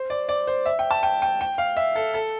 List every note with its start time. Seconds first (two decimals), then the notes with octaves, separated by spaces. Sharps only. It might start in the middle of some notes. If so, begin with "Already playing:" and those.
Already playing: C5
0.10 D5
0.29 D5
0.47 C5
0.66 E5
0.79 G5
0.91 A5
1.03 G5
1.22 G5
1.41 G5
1.58 F5
1.77 E5
1.96 A4
2.14 A4